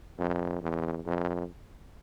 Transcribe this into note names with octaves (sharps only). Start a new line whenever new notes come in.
F2
E2
F2